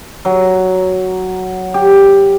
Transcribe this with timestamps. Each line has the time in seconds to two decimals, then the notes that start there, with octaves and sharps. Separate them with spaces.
0.25 F#3
1.74 G4